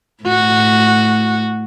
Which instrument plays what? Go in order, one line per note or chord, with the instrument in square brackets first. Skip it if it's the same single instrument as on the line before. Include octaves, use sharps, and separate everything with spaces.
[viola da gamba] A2 F#4